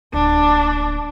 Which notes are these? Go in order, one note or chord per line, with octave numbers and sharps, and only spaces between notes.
D1 A#3 D4